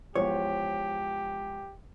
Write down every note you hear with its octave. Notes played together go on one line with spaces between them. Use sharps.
E2 G#2 F3 G4 C#5